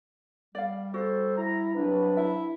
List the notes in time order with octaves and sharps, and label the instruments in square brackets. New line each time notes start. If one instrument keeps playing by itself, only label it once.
[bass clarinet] G3 [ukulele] D5 F5
[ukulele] F#4 [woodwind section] A4 C5
[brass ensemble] E4 [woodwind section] A#5
[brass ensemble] C2 B4 [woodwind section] F#3 D4
[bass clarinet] E4 [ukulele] E5